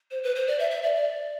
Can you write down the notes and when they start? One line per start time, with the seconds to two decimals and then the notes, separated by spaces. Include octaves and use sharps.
0.11 C5
0.24 B4
0.36 C5
0.48 D5
0.59 E5
0.71 E5
0.83 D5
0.95 D5